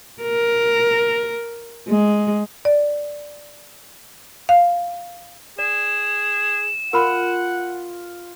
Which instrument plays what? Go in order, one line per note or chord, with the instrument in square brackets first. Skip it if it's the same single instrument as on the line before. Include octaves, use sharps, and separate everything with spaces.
[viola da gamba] A#4
G#3
[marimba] D5
F5
[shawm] G#4 [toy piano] D5 [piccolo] E7
[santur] F4 [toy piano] A#4 B5 [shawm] F#5